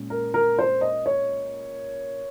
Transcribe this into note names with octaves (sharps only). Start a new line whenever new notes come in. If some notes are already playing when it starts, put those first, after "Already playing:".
Already playing: A#2 G#3 C#4
A#4
A#4
C5
D#5
C#5